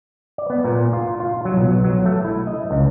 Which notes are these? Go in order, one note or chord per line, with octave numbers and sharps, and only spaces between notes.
D5
B3
A#2
F4
F4
F#3
B1
F#3
A3
E4
D#5
C#2